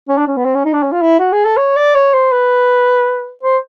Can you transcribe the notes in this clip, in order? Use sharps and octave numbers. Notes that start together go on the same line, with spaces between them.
C#4
D4
C#4
B3
C4
C#4
D#4
D4
C#4
F4
E4
F#4
G#4
A4
C#5
D5
C#5
C5
B4
C5